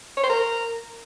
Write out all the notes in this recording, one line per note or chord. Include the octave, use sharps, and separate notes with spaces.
C#5
C5
A#4